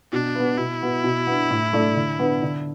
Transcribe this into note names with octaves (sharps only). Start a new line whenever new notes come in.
B2 D4
B3 F#4 B4
B2 E4
B3 F#4
B2
B3 D4
A2
A3 D4 A4 D5
D3
B3 D4 B4
D3